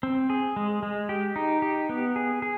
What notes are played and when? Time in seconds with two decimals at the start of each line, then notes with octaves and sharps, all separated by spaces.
0.03 C4
0.30 G#4
0.56 G#3
0.83 G#3
1.09 G4
1.36 D#4
1.62 G4
1.89 B3
2.16 G#4
2.42 G#4